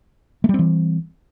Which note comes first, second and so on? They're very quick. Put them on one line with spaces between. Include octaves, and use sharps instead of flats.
A3 G3 C4 E3